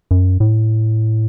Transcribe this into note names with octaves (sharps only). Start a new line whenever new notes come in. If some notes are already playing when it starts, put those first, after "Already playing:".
F#2
A2